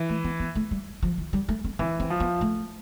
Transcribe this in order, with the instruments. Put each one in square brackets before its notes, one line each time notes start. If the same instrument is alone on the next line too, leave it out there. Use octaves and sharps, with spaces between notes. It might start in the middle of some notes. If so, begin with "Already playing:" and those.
Already playing: [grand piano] E3
[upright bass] A3
B3
B3
A3
G3
F3
E3
G3
A3
C4
[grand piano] E3 [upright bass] C4
[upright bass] C4
[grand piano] F3
[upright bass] B3
A3